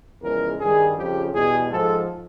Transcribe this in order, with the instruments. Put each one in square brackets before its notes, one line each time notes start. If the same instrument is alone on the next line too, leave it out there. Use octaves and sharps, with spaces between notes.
[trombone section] E2 C#3 F3 G#3 A#4
G2 D#3 G3 G#4
F2 C#3 F3 G4
E2 B2 G3 G#4
G#2 F3 G#3 A4